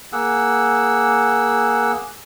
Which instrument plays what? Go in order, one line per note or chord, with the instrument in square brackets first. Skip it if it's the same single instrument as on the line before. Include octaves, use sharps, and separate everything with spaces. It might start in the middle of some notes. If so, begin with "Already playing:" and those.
[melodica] A#3 G#4 F#5 E6